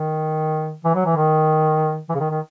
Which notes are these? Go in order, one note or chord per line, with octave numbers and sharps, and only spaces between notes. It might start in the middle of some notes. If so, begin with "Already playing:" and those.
Already playing: D#3
E3
F#3
E3
D#3
E3
C#3
D#3
D#3